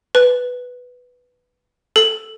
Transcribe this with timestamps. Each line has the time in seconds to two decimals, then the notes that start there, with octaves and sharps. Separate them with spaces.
0.15 B4
1.96 A4